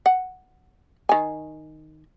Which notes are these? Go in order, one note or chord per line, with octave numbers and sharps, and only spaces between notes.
F#5
D#3 G#5